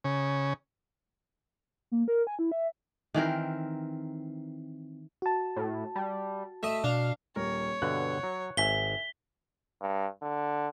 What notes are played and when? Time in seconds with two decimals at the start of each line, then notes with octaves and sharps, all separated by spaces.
0.04 C#3
1.92 A#3
2.08 A#4
2.27 G#5
2.39 E4
2.52 E5
3.14 D#3 E3 C4 A#4
5.22 F#4 A5
5.56 A2
5.95 G3
6.63 A3 D#5 E5
6.84 B2 D4 F5
7.36 D#1 A#4 C#5
7.82 G2 B2 D3 F#5 F#6
8.23 F#3
8.57 G#1 E5 G#5 B6 G7
9.81 G2
10.22 D3